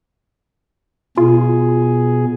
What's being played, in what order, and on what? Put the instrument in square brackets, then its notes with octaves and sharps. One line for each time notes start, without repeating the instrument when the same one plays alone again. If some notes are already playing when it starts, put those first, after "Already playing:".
[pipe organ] B2 G#4 [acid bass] F4